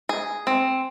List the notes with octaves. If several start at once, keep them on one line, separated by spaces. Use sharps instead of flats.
G#4
C4